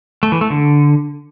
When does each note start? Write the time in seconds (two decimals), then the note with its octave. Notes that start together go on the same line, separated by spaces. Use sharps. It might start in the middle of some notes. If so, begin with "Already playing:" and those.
0.23 A3
0.32 E3
0.41 A3
0.50 D3